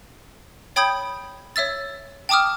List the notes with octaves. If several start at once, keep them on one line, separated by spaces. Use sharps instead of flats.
C#5 G5 B5 D#6 G6 G#6
C#5 E5 E6 A6
G5 A5 D6 D#6 F6